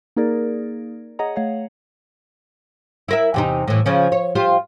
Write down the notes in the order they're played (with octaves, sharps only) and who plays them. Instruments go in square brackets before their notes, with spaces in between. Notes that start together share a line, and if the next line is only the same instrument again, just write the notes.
[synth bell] A#3 D#4 G#4 A#4 D5
G#4 C#5 D#5 F#5 A#5
A3 C#5 F5 F#5
[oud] E4 A#4 E5
E2 C3 D#4
A2 E3
C#3 F3 C#4
C#5
F4 G4 C5